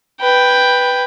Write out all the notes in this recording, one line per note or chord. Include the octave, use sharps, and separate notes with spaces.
B4 G5